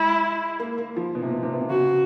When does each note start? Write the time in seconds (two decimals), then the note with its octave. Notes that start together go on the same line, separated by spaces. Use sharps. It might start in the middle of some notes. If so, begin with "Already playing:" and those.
Already playing: G#3 E4
0.60 A#3
0.78 A#3
0.96 F3
1.15 B2
1.22 C3
1.30 B2
1.43 C3
1.53 B2
1.61 C3
1.70 C#3 F#4